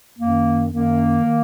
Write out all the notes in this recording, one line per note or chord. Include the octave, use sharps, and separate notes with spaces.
F#2 D#3 A#3
F#2 D#3 A#3
D#3